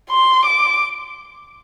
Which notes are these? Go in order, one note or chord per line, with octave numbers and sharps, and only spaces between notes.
C6
D6